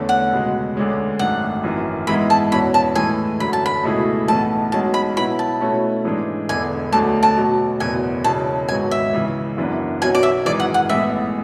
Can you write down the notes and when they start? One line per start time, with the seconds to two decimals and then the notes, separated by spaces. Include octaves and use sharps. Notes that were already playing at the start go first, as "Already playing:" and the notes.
Already playing: E2 D3 A3 C#4
0.09 F#5
0.31 C#2 B2 G#3
0.75 D2 D3 G#3 C#4
1.19 G#1 F#2 D3 A3 F#5
1.63 G#1 F#2 E3
2.07 G#2 E3 G#3 B3 E4 B5
2.30 A5
2.52 E2 B2 F#3 C#4 F#4 B5
2.74 A5
2.95 A2 E3 G#3 G#5
3.40 F#2 D3 F#3 B5
3.53 A5
3.66 B5
3.84 C#2 B2 A3 E4 G#4
4.28 B1 A2 E3 B3 A5
4.72 B1 B2 G#3 C#4 F#4 A5
4.94 B5
5.16 B2 F#3 B3 E4 B5
5.39 A5
5.60 B2 A3 C#4 E4
6.05 G#2 E3 G#3 D4
6.49 E1 E2 D3 G#5
6.92 E1 D2 D3 F#3 A3 A5
7.23 A5
7.37 B2 F#3 A3
7.80 F#1 E2 B2 F#3 G#5
8.24 E1 E2 C#3 F#3 C#4 A5
8.68 G#1 G#2 F#3 B3 F#4 G#5
8.91 E5
9.13 C#2 C#3 E3
9.57 F#1 F#2 E3 B3 D4
10.02 B1 B2 F#3 C#4 F#4 G#5
10.15 D5
10.23 E5
10.45 G#1 F#2 E3 G#3 D5
10.60 F#5
10.74 F#5
10.89 A1 A2 G#3 B3 E5